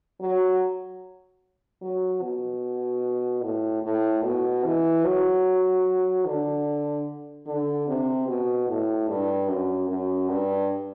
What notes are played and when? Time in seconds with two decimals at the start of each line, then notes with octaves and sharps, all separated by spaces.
0.20 F#3
1.82 F#3
2.22 B2
3.43 A2
3.83 A2
4.24 B2
4.64 E3
5.04 F#3
6.25 D3
7.46 D3
7.87 C3
8.27 B2
8.67 A2
9.08 G2
9.48 F#2
9.88 F#2
10.29 G2